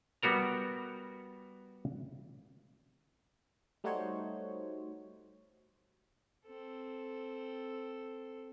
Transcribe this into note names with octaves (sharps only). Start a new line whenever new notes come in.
G3 B3 F#4 A#4 A#5
G3 A3 D#4 F#4 C5 C#5
C4 A4